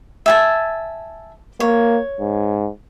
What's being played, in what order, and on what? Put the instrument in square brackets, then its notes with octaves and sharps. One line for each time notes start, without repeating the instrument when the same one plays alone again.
[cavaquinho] E5 G#5 A5
[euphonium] A#3 [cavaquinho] C#5
[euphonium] G#2